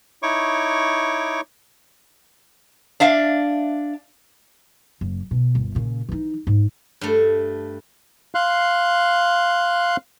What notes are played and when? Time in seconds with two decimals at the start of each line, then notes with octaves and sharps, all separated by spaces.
0.23 D#4 E4 C#5 C#6 D6
3.00 D4 E5 F5
5.01 F#1
5.31 B2
5.55 G1 D#2
5.75 A#2 C#3
6.09 E3 D#4
6.47 G#2
7.01 G2 A3
8.35 F5 C6 F#6